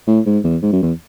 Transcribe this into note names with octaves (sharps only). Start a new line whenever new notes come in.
A2
G#2
E2
G#2
F#2
E2